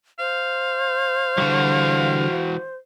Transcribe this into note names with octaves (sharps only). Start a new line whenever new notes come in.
C5 F5
D3 E3 G3 F#4